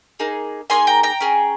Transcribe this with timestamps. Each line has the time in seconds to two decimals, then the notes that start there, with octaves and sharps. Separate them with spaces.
0.20 A#3 D#4 G#4
0.70 A#3 D#4 G#4 G#5 C6
0.87 G5 A#5
1.03 G5 A#5
1.20 C#4 G#4